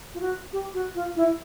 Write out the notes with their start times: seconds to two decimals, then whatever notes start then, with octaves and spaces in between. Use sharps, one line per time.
0.14 F4
0.21 F#4
0.53 G4
0.74 F#4
0.95 F4
1.16 E4